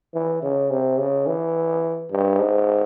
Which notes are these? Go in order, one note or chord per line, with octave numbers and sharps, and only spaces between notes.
E3
C#3
C3
C#3
E3
G2
G#2